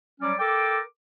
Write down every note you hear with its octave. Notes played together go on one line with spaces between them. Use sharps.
F#3 G3 C#4 D5
A4 A#4 G5 D6